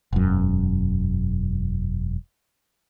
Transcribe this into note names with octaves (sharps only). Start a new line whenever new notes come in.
E1 F#2